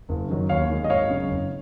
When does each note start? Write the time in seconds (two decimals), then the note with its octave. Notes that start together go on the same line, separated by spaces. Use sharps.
0.09 F#1
0.29 F#2 D#3 F#3
0.49 D#2 C#5 F5
0.70 D#3 G#3
0.84 D#5
0.90 G#1 C#5 F5
1.10 F#2 C#3
1.31 F#1